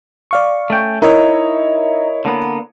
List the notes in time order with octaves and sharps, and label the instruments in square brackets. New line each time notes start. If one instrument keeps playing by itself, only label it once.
[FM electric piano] D5 F5 C#6
[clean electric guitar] A3 C#4 G5
[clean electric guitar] D#4 [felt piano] E4 C#5 [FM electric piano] A#4 D#5 E5
[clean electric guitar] D3 A#3 B3